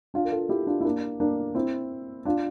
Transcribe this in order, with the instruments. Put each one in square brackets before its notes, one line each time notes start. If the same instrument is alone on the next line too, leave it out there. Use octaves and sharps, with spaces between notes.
[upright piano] D4 F4
A#4
F4 A4
E4 G4
D4 F4
E4
A#3 D4
A#3 D4
C4 E4
D4 F4